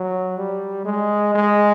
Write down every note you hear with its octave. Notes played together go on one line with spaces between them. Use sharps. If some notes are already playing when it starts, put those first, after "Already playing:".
Already playing: F#3
G3
G#3
G#3